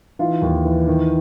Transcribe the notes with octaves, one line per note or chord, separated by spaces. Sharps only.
E3 D#4 F4
D#2
E3
D#3